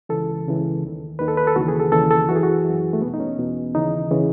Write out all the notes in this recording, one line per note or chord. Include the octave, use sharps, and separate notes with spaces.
C#2 C#3 E3 A4
C#2 C#3 E3
D#2 D#3
D#2 D#3 B4
A4
B4
A4
D#2 C#3 E3 F#4
G#4
A4
D#2 C#3 E3 A4
A4
F#2 E3 F#4
G#4
F#4
F#2 E3
A3
E2 B2 B3
D#4
C#4
E2 B2
D#2 C#3 E3 D#4
C#3 E3